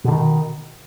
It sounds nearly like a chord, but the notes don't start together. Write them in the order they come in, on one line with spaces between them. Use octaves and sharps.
B2 D3 D#3